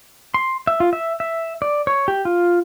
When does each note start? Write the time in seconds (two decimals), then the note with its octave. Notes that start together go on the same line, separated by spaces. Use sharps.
0.34 C6
0.67 E5
0.80 F4
0.93 E5
1.20 E5
1.62 D5
1.87 C#5
2.08 G4
2.25 F4